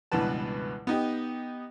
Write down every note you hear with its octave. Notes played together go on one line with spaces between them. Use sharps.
C#2 G2 B2 E3 B4 A5
B3 D#4 G4